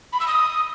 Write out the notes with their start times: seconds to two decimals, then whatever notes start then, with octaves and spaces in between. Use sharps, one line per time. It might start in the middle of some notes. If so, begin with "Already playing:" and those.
0.13 B5
0.20 E6
0.28 D#6